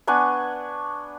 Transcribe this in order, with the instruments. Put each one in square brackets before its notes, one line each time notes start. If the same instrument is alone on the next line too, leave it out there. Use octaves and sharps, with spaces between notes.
[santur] B3 D4 G#5 C#6